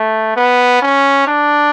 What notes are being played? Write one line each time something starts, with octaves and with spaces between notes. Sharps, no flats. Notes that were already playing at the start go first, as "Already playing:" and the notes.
Already playing: A3
B3
C#4
D4